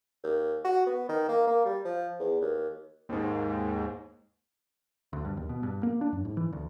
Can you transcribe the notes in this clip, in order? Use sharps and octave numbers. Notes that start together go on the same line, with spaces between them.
D#2
F#4
B3
D#3
A#3
A#3
G3
F3
E2
D#2
D#2 G#2
D2
G2
D#2
B2
G2
A#3
D4
F#2
G#2
E3
D2